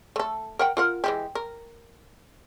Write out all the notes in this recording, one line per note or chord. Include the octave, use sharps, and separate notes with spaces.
A3 A4
A#4 F#5 G5
F4 A#4 F#5
E3 G#3 G4
A#4